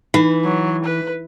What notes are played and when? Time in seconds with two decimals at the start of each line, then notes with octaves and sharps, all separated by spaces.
0.14 E3 D#4
0.44 F#3
0.84 B4